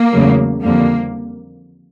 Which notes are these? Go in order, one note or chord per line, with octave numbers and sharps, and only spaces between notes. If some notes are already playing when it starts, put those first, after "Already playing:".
Already playing: A#3
E2 C#3 F#3 A3
F2 D3 G3 A#3